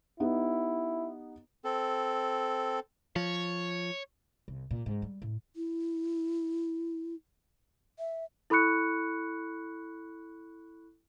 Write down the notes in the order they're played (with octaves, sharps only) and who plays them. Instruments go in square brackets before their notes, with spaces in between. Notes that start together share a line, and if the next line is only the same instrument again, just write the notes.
[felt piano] B3 D#4 G4 [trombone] E4
[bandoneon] C4 A4
[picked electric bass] F3 [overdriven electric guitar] C#5
[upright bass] C2
A#2
G#2
G3
A2
[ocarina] E4
E5
[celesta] E4 A4 B5 C#6 F#6 C#7